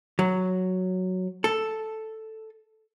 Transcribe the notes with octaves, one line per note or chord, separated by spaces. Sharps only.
F#3
A4